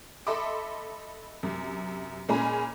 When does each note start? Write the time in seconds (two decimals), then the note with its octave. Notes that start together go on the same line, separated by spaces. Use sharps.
0.27 A4 D#5 E5 B5 C6 D6
1.43 F#2 C3
2.29 A#2 G#3 C#4 G#5 A#5 B5